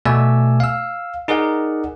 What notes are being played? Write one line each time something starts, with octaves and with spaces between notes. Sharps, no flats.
B2 A3 D5 G#5 E6
F5 E6
D#4 G#4 A#4 D5 F#5